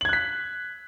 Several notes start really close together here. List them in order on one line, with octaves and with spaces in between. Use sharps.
F#7 G#6 F#6 B6